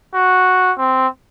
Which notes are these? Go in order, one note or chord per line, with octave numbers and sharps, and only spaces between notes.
F#4
C4